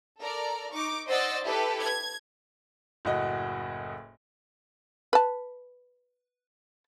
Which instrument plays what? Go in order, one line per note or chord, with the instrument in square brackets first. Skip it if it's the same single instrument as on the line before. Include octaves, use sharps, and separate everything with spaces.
[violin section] A4 A#4 D5 A#5
D#4 C#6 D6
C5 D5 D#5 F#5 E6 A6
E4 G4 A4 B4
G#6
[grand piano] F#1 A2 F#4 D#5
[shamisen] B4 A5